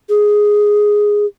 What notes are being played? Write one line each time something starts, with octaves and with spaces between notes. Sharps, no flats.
G#4